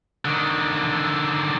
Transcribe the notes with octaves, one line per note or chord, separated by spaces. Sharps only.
D3 D#3